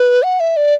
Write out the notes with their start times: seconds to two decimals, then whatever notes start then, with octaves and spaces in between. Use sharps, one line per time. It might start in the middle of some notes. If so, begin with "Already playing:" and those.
Already playing: B4
0.23 F#5
0.40 E5
0.57 D5